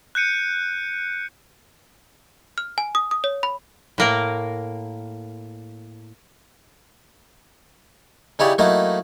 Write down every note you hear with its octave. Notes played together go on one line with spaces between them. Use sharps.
F#6 G6 C#7 D#7
F6
G#5
D#6
D#6
C#5
B5
A2 A#3 A#4
C#3 D#4 E4 G4 C#5 D5
F#3 A3 A#3 D#4 E4 D#5